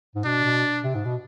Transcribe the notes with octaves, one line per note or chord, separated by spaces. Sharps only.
G#2
B2 D4
B2
C3
G#2
B2